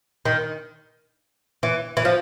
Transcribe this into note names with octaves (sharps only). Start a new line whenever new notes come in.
D#3
E3
E3
F3